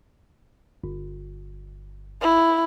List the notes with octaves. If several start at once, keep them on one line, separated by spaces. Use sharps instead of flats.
G1
E4